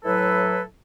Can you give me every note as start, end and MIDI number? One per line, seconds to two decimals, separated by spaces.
0.04 0.61 45
0.04 0.61 54
0.04 0.61 64
0.04 0.61 69
0.04 0.61 71